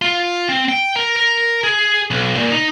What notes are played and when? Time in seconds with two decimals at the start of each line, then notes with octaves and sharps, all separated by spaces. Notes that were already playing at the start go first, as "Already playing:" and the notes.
0.02 F4
0.49 C4
0.69 G5
0.96 A#4
1.16 A#4
1.64 G#4
2.11 B1
2.36 A#2
2.52 D#4